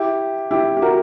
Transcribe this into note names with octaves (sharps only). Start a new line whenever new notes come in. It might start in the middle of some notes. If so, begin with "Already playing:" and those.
Already playing: E4 G4
E4 G4
G4
F#4 A#4